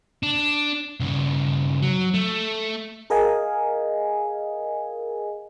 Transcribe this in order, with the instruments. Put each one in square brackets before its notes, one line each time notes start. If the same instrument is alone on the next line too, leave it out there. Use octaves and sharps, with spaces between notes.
[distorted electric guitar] D4
G2 C#3
F#3
A3
[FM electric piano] G#4 A#4 D#5 F5 G#5